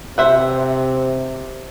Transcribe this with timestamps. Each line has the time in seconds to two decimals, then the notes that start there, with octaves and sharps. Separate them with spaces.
0.18 C3 C5 E5 F#5